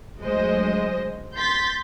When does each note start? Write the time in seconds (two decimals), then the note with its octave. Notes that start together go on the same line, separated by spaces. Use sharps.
0.20 D2 F#3 G#3 C5 D#5
1.35 C6 G6 A6 B6